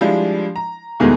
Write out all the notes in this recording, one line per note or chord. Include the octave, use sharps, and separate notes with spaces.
F3 G3 G#3 D4 E4
A#5
E2 B2 D#3 G#3 A3 B3